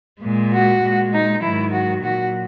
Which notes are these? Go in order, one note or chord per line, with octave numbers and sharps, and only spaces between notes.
A#2 G#3
F#4
A#2 G#3
D#4
G#2 D#3 F#3 E4
F#4
A#2 F#3 F#4